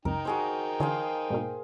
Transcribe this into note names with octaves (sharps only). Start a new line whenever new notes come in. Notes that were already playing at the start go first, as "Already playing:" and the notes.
C#2 F#2 D#4 A#4 G5
F#4 G#4 C5
D3 E3 D4 G#4 C5 F5
G#2 B2 A#3